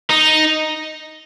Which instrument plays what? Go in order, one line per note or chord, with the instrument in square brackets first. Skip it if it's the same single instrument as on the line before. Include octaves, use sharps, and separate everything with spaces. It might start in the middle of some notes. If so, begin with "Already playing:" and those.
[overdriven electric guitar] D#4